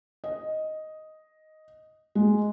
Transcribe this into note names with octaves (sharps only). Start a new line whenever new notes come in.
D#5
G#3